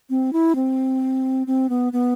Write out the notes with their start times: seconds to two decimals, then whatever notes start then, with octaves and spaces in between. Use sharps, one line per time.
0.10 C4
0.33 E4
0.55 C4
1.47 C4
1.69 B3
1.93 B3